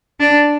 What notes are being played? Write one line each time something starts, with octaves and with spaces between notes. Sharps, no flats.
D4